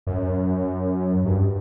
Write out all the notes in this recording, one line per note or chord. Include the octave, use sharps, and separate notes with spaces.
F#2
G2